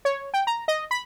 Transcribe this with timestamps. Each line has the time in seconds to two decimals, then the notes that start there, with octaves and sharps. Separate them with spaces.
0.05 C#5
0.34 G5
0.47 A#5
0.68 D#5
0.91 B5